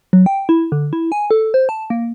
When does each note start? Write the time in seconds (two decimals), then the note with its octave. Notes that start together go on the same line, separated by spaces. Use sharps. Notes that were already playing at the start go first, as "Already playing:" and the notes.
0.13 F#3
0.26 G5
0.49 E4
0.72 D3
0.93 E4
1.12 G#5
1.31 A4
1.54 C5
1.69 A5
1.90 A#3